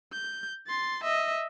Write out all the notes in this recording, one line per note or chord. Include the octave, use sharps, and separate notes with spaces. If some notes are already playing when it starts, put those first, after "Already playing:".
G6
C6 A6
D#5 E5